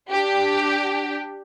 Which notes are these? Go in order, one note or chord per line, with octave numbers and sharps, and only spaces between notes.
D4 G4